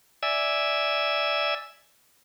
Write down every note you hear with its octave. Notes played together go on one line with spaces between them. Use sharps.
D5 E5 G#5 E6